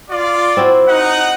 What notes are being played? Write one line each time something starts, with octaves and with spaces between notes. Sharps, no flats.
F4 D5
C4 E4 F#4
D#4 F#5